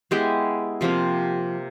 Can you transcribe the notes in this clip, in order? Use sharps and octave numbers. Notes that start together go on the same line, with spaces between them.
G#3 B3 E4 G4
C3 F3 A#3